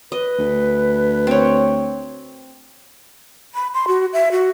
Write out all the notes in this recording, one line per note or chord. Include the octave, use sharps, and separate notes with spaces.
B4 D#5
D2
C4 C#5
B5
C6
F#4
E5
F#4